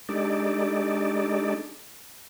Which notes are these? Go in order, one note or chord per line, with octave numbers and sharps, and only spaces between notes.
G#3 D4 D#4 G4 A4 D5